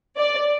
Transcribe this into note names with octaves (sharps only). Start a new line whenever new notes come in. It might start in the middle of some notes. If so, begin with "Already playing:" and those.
D5